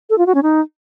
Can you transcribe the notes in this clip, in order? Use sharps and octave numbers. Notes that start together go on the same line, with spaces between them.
A4
F4
F#4
C#4
D#4